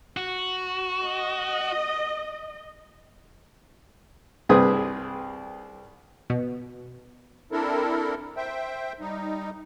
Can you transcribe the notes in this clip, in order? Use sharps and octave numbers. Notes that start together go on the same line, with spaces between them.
F#4
D#5
C2 G2 C4 G#4 B4 D#6
B2
C4 D4 E4 A4 A#4
C5 E5 G5
G3 D#4